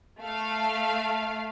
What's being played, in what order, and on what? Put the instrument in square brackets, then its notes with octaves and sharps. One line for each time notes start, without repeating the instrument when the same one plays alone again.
[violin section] A3 F5